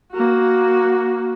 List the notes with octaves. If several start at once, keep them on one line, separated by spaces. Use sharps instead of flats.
A#3 F#4